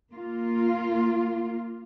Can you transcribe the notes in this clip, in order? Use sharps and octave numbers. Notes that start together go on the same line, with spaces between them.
A#3 F4